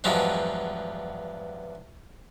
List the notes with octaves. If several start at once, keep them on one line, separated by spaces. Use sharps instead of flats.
E2 G2 F3 F#3 G#3